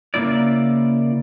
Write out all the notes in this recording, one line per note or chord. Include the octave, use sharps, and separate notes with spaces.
C#3 A#3 E4 D5